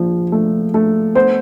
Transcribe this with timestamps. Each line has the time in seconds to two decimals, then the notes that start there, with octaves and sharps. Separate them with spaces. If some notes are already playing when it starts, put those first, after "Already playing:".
Already playing: A#1 F3
0.32 A3
0.74 A3
1.15 B3 C5